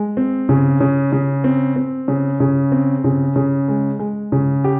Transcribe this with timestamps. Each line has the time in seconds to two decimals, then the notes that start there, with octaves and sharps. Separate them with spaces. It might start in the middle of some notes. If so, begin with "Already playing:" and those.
Already playing: G#3
0.17 C4
0.49 C#3
0.81 C#3
1.13 C#3
1.44 C4
1.76 C4
2.08 C#3
2.40 C#3
2.72 C4
3.04 C#3
3.36 C#3
3.68 G#3
3.99 G#3
4.32 C#3
4.64 G4